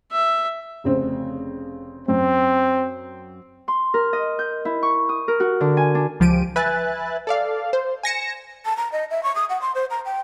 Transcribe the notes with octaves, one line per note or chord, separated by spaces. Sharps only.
E5
F1 C#3 C4
F#2 C4
C6
A#4
D#5
G6
E4
C#6
D#6
A#4
F#4
D3
G#5
D4
C#2 F3 G4 D7 D#7
B4 E5 G#5 F#6 A6
A4 D5 F5
C5
G#5 A#6 C#7 E7
A5
A#5
D#5
E5
C#6
D#6
F#5
C6
C5
A#5
G5